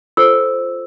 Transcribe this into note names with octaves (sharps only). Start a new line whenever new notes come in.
F4 A4 C5 E6